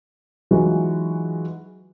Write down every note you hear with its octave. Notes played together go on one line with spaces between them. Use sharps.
E3 F#3 G#3 D#4 F4 F#4